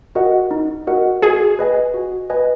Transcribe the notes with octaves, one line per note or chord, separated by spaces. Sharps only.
F#4 A#4 D#5 F#5
D#4
F#4 A#4 D#5 F#5
F#4 G#4
B4 D#5 G#5
F#4
B4 D#5 G#5